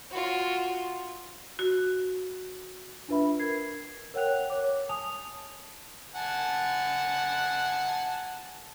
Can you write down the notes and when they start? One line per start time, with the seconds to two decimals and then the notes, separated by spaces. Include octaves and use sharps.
0.10 F4 F#4
1.59 F#4
3.09 D4 F4 B4 E5 B5
3.39 A#4 G#6 C7
4.14 A#4 C#5 F#5 G5 F#6 F7
4.50 C#5 D6
4.89 G#5 A5 D#6 F7
6.15 F#5 G#5 A5